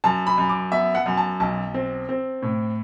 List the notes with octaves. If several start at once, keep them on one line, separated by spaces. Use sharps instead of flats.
F#2 A5
B5
F#2
D6
B3 E5
F#5
F#2
A5
B1 A5
C4
C4
A2